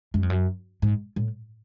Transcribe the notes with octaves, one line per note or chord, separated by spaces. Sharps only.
F#2
F2
F#2
G#2
A2